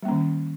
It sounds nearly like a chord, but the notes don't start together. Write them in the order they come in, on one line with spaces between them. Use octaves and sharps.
G3 A#3 C#4 D#3